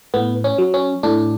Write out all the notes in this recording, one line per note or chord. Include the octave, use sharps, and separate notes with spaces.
A2 B3
C#4
F#3
C#4
A2 D4